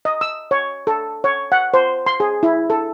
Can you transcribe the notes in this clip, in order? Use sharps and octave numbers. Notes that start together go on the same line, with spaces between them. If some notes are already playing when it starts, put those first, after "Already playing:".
D#5
E6
C#5
A4
C#5
F#5
C5
C6
G#4
E4
A4